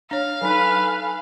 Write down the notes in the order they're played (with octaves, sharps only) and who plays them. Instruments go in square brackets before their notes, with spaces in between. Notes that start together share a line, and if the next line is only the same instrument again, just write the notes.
[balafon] D4 C#5 [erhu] F5
[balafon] F#3 D#4 [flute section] A4 G#5 B5 [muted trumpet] B4